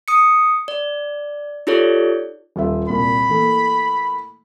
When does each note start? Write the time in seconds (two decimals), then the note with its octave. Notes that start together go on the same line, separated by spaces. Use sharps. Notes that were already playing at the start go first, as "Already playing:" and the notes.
0.08 D#6 C#7
0.68 D5
1.67 D#4 F4 G4 A4 C#5 D5
2.56 D#1 F4 E5
2.88 C2 A#2 B5
3.29 E3 A3 A#3